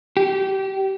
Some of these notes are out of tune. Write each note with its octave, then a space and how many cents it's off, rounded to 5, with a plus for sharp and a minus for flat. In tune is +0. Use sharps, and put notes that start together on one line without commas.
G4 -25